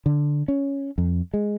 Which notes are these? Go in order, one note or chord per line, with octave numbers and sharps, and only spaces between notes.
D3
C#4
F2
G#3